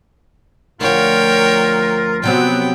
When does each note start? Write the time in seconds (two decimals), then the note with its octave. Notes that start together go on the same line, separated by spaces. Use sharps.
0.81 D2 F3 F4 A#4 C#5 G5
2.24 C3 F#3 B3 C4 G5